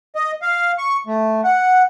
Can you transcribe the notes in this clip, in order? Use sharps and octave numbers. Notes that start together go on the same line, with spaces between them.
D#5
F5
C#6
A3
F#5